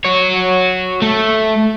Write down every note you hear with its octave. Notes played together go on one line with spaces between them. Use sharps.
F#4 C#5
A3